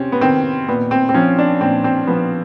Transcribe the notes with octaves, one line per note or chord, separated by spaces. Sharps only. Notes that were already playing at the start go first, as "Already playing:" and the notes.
Already playing: C3 C4 C#4
B3
D#3 C4
A#2 B3
C4
C4
F3 C#4
D4
A#2 C4
C4
F3 B3